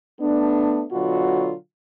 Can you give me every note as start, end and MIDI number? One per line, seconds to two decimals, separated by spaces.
0.20 0.84 57
0.20 0.84 59
0.20 0.84 62
0.92 1.53 47
0.92 1.53 50
0.92 1.53 54
0.92 1.53 65
0.92 1.53 66